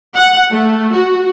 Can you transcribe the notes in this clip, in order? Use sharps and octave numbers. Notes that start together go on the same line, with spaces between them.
F#5
A3
F#4